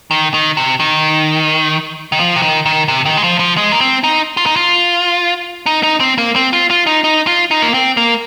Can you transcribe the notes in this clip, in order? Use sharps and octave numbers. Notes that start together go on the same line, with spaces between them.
D#3
D#3
C3
D#3
D#3
F3
C3
D#3
D#3
C3
D#3
G#3
F3
F3
G#3
A#3
C4
D#4
F4
D#4
F4
D#4
D#4
C4
A#3
C4
F4
F4
D#4
D#4
F4
D#4
A#3
C4
A#3